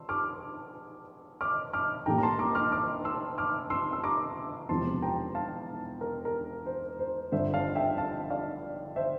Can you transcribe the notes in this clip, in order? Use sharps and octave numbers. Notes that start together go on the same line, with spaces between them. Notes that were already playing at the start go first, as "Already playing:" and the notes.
Already playing: C6 E6
D6 F6
D6 F6
D6 F6
A1 A2 G3 A#3 G5 A#5
A#5
A5 C6
A#5 D6
D6 F6
D6 F6
C6 E6
D6 F6
C6 E6
E6
A#5 D6
E1 E2 C3 F3 C4 A5 C6
G5 A#5
F5 A5
A#4
A#4
C5
C5
G1 G2 D3 C5 E5
F5 A5
E5 G5
F5 A5
D5 F5
C5 E5